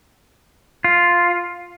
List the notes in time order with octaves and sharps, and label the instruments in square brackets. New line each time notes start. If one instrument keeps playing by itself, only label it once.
[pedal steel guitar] F4